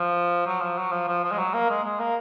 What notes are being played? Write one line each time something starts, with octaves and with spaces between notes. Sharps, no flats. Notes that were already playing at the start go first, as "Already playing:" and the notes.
Already playing: F3
F#3
F3
F#3
F3
F3
F3
G#3
F#3
A#3
G#3
G#3
A#3